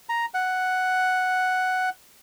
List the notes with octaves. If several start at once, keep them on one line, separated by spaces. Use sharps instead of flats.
A#5
F#5